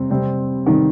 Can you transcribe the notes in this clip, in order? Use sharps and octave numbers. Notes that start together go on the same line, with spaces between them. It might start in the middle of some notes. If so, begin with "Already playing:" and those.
Already playing: C3 G3 C4
C3 G3 C4
C3 D#3 G3 C4